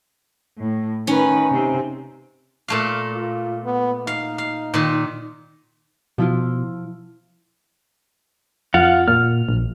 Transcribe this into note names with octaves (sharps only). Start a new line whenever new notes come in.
A2
D#3 C#4 D#4 B4
C3 C4
A#2 A3 F5
F4
B3
D#4 F5
F5
A#2 D#3
B2 F3 E4 F4
F2 F4 F5 F#5
A#2 F6
A#1